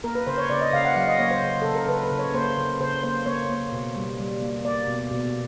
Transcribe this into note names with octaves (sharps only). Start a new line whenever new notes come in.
A#3 A#4
B4
C#3 C5
C#5
C#3 D5
D#5
C#3 F5
F#5
F#3 F5
D#5
A#3 C#5
C5
C#3
C#3 A4
A#4
C#3 B4
B4
C#3
C#5
A#3 C5
C#3
C#3 C5
A#3 C5
A#3 C#5
A#3
B2
G3
G3
A#3
A#3 D5
B2
B2